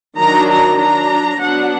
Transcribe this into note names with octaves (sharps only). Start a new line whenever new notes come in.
D#3 F#3 D4 A#5
A#5
F#3 D4 A#5
F#3 B3 D4 F#5